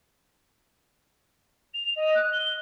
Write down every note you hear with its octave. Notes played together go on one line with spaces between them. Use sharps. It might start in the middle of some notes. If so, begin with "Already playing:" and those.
F7
D#5
F#6
G7